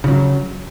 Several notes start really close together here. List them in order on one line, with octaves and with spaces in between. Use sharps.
C#3 F3 F#3